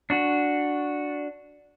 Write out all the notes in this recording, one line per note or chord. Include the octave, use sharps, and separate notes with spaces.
D4 F#4